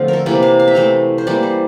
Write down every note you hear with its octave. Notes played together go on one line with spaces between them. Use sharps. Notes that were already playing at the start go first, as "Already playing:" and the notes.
Already playing: D3 F3 A3 C4 F4
A#4
A4
C3 E3 A#3 D5
F5
F5
E5
E3 A3 F5
C5
E3 G3 A#3 D5
C5